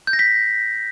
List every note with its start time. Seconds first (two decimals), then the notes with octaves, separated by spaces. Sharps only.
0.07 G6
0.13 A#6
0.19 B6